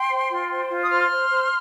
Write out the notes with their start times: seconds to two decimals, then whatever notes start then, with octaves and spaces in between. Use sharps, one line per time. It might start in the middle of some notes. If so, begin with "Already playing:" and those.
Already playing: G5 C6
0.09 C5
0.29 F4
0.49 C5
0.70 F4
0.83 D#6
0.89 C5 C6 F6
1.09 C5
1.30 C5